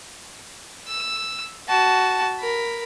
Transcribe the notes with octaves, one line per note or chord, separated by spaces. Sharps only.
E6
F#4 A5
A#4 B5